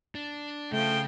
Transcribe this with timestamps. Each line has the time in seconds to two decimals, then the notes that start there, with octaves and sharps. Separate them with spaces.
0.15 D4
0.72 C#3 F3 A3 G5